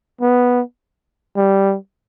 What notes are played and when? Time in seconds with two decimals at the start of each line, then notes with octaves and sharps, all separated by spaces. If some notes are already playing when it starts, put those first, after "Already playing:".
0.21 B3
1.36 G3